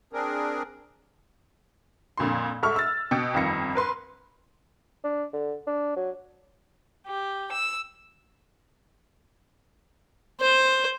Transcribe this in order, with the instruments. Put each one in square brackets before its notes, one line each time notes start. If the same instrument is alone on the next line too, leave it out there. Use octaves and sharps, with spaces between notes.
[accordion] C4 D4 G#4 A#4
[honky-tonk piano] F2 A#2 D3 C6
G#2 A4 E5 C#6 F6
E6 A6
B2 G5 C#7
G1 F2 D#3 F4 A#6 C#7
A#4 B4 C6
[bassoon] D4
D3
D4
F#3
[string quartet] G4
E6
[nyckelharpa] C5